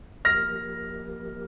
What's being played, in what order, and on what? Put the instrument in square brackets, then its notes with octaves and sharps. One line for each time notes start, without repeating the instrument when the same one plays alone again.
[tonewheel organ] F3 A#3 G4 A#4 [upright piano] F6 A#6